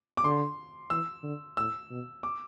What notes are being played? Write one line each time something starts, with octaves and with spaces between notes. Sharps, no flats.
D6
D3 C6
E3 E6
D3
A2 E6
B2
D6